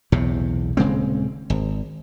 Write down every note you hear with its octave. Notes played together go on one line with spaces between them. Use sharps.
B1 E2 A2 C3
D#1 C#3 G#3 C4
G#1